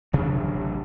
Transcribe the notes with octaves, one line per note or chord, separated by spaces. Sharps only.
A1 C3 F#3 D4